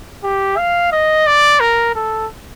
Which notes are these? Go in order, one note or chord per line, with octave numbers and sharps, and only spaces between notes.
G4
F5
D#5
D5
A#4
A4